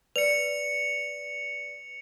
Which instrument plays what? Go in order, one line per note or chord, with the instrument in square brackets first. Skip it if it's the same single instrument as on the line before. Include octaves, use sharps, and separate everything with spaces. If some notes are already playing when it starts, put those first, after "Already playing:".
[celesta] B4 D5 [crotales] C#7 F7